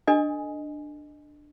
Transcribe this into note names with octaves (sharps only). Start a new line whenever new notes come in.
D4 A4 D#5 G#5